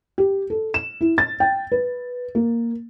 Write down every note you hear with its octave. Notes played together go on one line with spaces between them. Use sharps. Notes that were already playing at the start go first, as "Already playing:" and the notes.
G4
A4
E7
E4
A6
G5
B4
A#3